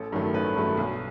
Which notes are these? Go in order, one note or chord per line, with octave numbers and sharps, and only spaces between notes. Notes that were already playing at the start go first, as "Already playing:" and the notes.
Already playing: A1 A4
G2 D#3 F#3 A3
A1 B4
G2 D#3 F#3 A3
B1